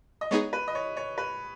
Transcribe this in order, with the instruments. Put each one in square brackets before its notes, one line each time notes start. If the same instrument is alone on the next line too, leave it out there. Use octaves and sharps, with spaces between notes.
[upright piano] D#5
[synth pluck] G#3 B3 D#4 G#4 [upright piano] C#5
[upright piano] B4
D#5
C#5
C#5
B4